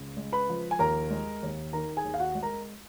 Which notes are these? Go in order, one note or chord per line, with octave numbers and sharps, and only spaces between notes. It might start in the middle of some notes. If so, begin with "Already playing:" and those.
Already playing: C#2 C#3
G#3
B4 B5
F3
G#5
D#2 A#4 A#5
G#3
D#2
D#3 A#4 A#5
G#4 G#5
D#2
F5
F#4 F#5
G#3
A#4 A#5